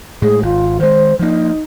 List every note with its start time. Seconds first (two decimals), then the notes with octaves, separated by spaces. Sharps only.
0.22 A2 G#3 G#4
0.42 G#1 F4
0.80 D#3 G#3 C5
1.19 F3 A#3 D#4